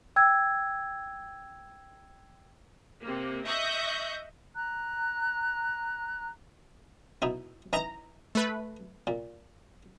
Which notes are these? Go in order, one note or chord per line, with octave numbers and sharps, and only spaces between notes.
G5 E6 G#6
C3 A#3
D#5 E5 C#6 F#6 G6 A#6
A#5 F#6
B2 D#4 E4
E3 D#4 E4 A#5
A3 B4
A#2